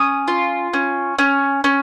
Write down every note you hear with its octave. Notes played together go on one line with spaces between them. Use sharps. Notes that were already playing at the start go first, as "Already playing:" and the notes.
Already playing: C#4 D#6
F4
C#4
C#4
C#4